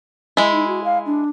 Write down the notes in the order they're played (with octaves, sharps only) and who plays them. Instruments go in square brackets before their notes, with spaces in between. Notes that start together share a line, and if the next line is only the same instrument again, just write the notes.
[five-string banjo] G#3 E4
[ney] D#4
F#4
F5
D4